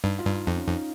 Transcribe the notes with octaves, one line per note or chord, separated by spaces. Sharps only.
G2 D#4
F4
G2
D#4
F2 D#4
C#4
F2 D#4